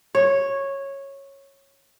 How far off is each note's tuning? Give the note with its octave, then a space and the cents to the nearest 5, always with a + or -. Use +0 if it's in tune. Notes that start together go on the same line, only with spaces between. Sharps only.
C#5 -10